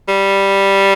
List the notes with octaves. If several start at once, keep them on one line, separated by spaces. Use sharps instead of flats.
G3